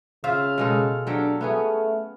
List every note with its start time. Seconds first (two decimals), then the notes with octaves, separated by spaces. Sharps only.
0.24 C#3 F4 C5 E5 F5
0.58 B2 G#3 A4
1.07 F#3 D4 G4 A4
1.41 A3 B3 C#4 G#4